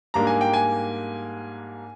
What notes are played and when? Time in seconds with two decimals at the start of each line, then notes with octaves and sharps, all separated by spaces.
0.14 G#2 G3 A#3 D4 A#5
0.27 G#5
0.41 G5
0.54 G#5